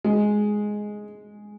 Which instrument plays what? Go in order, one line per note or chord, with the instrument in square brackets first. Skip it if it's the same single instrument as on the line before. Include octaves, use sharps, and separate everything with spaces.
[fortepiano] G#3